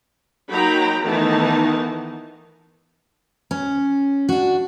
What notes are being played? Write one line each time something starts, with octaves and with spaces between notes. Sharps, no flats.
F#3 A#3 D#4 G5 A#5 B5
D#3 E3 A3 B3 D#4 A5
C#4
D4 F#4